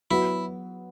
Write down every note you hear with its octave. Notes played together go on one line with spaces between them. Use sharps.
F#3 B3 E4 F#4